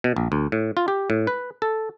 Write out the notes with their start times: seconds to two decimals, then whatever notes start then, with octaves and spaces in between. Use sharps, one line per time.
0.04 B2
0.16 A#1
0.32 D2
0.52 A2
0.77 F4
0.88 G4
1.10 A2
1.27 B4
1.62 A4